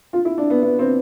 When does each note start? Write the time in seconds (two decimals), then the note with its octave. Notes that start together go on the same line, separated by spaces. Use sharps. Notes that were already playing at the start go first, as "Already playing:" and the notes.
0.13 F4
0.25 E4
0.38 D4
0.50 B3
0.63 B3
0.79 C4